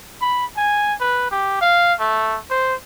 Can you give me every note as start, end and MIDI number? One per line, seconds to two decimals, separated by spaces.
0.21 0.46 83
0.57 0.94 80
1.00 1.29 71
1.31 1.60 67
1.61 1.93 77
1.99 2.37 57
2.50 2.74 72